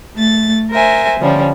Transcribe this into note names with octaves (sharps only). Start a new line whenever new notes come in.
A3 A6
A#4 C5 E5 G#5
D3 F3 G3 C#4